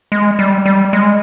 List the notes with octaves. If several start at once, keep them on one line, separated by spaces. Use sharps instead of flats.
G#3
G3
G3
G#3